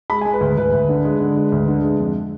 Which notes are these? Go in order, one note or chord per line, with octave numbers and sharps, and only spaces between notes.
G#3 B5
G#5
G#3
B4
D2
D2 B4
D2
D3
G#3
D3
G#3
D2
D3
G#3
F2